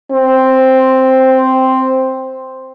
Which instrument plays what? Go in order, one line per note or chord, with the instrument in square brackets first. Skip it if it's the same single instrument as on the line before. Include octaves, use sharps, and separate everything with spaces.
[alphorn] C4